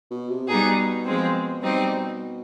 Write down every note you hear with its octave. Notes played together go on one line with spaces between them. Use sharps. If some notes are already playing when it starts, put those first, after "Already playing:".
B2
C3
B2 G3 B3 D#4 G#4
F3 G#3 C4
G3 C4 D#4